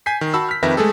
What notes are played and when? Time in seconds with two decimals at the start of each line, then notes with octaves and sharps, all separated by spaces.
0.06 G#5 G6 B6 C7
0.21 D#3
0.34 F#4 A5 B5 E6
0.49 F6 B6
0.63 F2 D#3 B4 E5 A#6
0.77 G#3 A3 G#4 A4